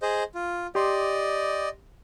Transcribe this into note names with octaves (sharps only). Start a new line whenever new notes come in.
G#4 C5 D#5
F4
G4 D5 D#5 C6